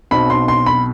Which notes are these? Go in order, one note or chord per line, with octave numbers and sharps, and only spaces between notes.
B1 B2 F#3 C4 B5
C6
C6
B5